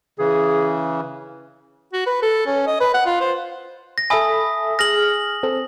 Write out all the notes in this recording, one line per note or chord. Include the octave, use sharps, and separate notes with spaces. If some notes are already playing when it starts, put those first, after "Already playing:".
C#3 E3 G#4
F#4
B4
A4
C#4
D#5
B4
F#5
F4
C5
A#6
A4 E5 G#5 B5 D#6
G#4 F6 A#6 F#7
C4 A4